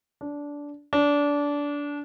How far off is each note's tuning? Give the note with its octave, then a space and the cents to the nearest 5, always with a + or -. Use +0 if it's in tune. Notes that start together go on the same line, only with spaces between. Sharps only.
D4 -15
D4 -20